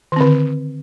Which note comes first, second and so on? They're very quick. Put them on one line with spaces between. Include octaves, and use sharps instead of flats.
D#3 C4 D3